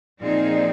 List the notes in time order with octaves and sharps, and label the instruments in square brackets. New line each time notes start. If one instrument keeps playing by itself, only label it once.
[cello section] A#2 F3 C4 D#4 G#4 [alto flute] D5
[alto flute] D5